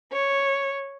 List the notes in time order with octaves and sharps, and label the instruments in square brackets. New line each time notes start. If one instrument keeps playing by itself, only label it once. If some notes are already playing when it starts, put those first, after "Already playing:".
[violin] C#5